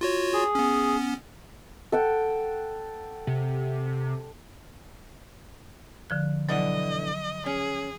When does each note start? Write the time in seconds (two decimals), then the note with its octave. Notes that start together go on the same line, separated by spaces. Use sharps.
0.01 F4 F#4 C#5
0.33 G#4
0.55 B3 C#4
1.92 A4 F#5 G5
3.27 C3
6.10 D3 F3 F#6
6.49 B2 D3 E3 F#3 D#5 F#5
7.46 C#4 G#4